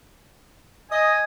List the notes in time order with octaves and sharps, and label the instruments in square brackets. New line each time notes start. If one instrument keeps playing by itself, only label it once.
[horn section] D#5 [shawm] G#5